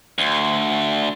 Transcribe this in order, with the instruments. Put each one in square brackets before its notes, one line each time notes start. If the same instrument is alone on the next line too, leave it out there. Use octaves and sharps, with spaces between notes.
[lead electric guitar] D2